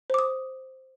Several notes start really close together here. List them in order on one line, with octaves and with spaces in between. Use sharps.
C5 D6 D#6